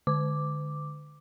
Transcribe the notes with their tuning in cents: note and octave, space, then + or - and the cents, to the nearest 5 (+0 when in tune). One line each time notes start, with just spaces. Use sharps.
D3 +20 D6 +0